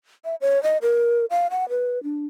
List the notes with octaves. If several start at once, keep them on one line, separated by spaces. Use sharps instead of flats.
E5
C#5
D#5
A#4
F5
F#5
B4
D4